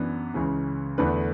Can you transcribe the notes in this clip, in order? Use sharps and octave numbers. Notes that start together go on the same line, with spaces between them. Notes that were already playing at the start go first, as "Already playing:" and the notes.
Already playing: F#2 E3 B3 D4
C#2 C#3 E3
E2 D3 A3 D4 B4